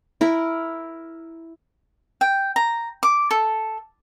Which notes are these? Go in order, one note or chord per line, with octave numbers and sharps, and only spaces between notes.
E4 A#4
G5
A#5
D6
A4